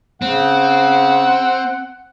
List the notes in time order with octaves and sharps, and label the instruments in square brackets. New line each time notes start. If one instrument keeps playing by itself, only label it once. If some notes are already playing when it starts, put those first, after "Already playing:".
[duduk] C#3 [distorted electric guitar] C4 [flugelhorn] F#5